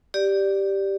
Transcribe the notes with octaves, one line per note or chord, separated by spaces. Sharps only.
G4 D5